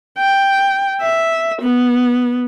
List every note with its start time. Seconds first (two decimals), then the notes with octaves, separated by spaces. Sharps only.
0.18 G5
1.01 E5
1.61 B3